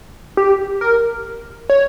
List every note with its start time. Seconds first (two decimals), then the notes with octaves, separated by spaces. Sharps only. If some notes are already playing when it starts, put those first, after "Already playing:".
0.37 G4
0.81 A#4
1.69 C#5